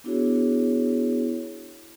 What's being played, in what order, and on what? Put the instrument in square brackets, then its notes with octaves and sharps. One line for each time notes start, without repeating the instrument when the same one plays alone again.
[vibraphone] B3 D4 E4 F#4 G#4 C#5